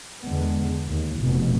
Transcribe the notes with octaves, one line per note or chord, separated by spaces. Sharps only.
E2 D3 G#3 B3
D#2
F1 B2